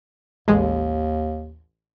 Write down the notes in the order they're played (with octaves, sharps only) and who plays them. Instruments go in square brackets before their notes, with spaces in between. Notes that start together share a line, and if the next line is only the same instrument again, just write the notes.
[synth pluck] A1 G#3 [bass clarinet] D#2